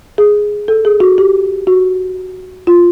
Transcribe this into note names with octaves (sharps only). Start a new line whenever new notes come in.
G#4
A4
G#4
F#4
G4
F#4
F4